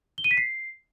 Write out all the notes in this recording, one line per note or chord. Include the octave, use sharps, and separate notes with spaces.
G7
D#7
B6
C7